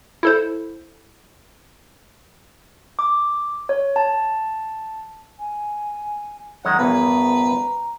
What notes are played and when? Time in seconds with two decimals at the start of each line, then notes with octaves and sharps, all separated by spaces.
0.23 E4 A4 C5
2.99 D6
3.69 C#5
3.96 A5
5.39 G#5
6.65 F#2 D#3 G#3 F#5
6.79 A#1 E2 G2 B3 B4 A#5